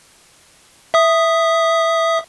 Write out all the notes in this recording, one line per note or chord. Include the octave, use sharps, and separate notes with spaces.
E5 D#6